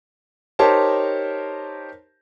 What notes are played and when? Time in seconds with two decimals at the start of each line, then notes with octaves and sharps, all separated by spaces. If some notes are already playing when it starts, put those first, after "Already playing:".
0.59 D#4 G4 A#4 C5 C#5 A5